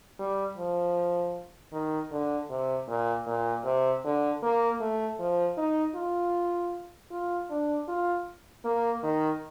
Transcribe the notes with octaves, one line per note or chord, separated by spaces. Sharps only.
G3
F3
D#3
D3
C3
A#2
A#2
C3
D3
A#3
A3
F3
D#4
F4
F4
D4
F4
A#3
D#3